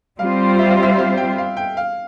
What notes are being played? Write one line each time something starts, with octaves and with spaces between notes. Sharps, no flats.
G3 C4 F4 C5 F5
E5
F5
E5
F5
G5
F5
G5
F5